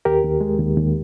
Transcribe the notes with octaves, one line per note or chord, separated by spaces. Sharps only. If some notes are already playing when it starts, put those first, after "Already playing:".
D#2 G4 A#4
D#2
G#3
D#2
D#2